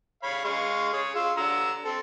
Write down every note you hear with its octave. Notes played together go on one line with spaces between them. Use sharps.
C#5 F5 B5
G#3 F5 C#6
G#4 C#5
F4 E6
D3 A#5 E6
C4 A4